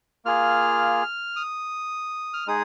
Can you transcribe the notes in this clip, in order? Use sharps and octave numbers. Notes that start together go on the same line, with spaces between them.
A#3 F4 G#4 F6
D#6
F6
G#3 D#4 G#4 D#6